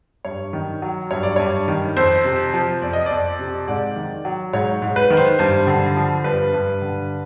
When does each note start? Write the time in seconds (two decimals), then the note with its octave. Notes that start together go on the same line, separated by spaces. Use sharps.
0.25 G2 C#5
0.53 D#3
0.82 F#3
1.11 G2 C#5
1.23 D5
1.36 G2 C#5
1.68 D#3
1.96 F2 C5
2.25 C3
2.54 F3
2.82 F2 D5
2.93 D#5
3.06 F2 D5
3.39 C3
3.68 G#2 D5
3.96 D#3
4.25 F#3
4.53 G#2 C#5
4.82 G#2
4.96 B4
5.10 D#3
5.17 C5
5.39 G2 C5
5.67 D3
5.96 F3
6.24 G2 B4
6.53 G2
6.82 D3